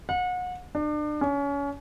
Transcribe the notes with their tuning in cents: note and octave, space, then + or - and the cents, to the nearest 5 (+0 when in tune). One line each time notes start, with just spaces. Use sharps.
F#5 -35
D4 +35
C#4 +30